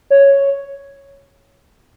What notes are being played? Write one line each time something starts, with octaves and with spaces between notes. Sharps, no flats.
C#5